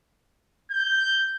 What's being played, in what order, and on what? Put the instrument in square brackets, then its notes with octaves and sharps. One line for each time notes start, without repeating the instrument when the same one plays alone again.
[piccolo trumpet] G6